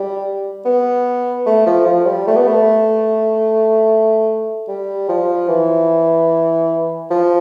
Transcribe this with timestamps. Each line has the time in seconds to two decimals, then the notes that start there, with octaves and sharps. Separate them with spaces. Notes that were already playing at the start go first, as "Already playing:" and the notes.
Already playing: G3
0.65 B3
1.46 A3
1.66 F3
1.86 F3
2.06 G3
2.27 A3
2.36 B3
2.47 A3
4.68 G3
5.09 F3
5.49 E3
7.10 F3